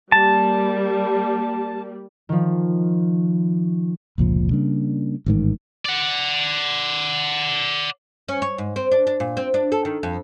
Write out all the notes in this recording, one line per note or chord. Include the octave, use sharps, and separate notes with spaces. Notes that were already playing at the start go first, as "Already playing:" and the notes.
G3 A#3 A5
D#3 F3
F1 C#2 A#2 F3
C#3 G3 A#3 D4
A1 G#2 D#3
D5 F#5
C#4
C#5
G#2
C4
D4
D4
A#2
C4
D4
A4
D#3
F2